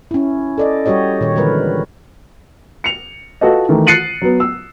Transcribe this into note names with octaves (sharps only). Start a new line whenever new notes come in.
C#4 E4
A4 D5 D#5
G3 F#4 G4 C#5 D#5
A#2 D#3 C#5
D3 E3 G#3 A#4 B4
C#7 F7
F4 F#4 A4 B4 D#5
D#3 E3 A3
F#6 A6 C7 C#7 D#7 F#7
F#3 B3
E6